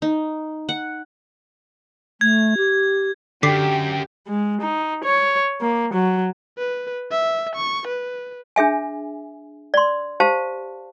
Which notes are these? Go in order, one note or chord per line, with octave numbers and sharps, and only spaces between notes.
D#4
F#5
A3 G#6
G4
F#2 D3 G4 D6 B6 C7
G#3
D#4
C#5
A#3
F#3
B4
E5
C#6
B4
D4 G#4 E5 G#5
D5 C6
G4 C5 F5 A5